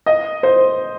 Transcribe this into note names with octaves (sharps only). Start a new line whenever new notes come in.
D#5
C5